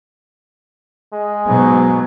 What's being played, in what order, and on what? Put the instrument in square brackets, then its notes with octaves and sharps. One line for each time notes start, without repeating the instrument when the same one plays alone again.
[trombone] G#3
[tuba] G#2 [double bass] B2 F#3